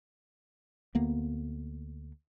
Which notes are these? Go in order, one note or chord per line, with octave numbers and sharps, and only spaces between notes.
D2 A#3 B3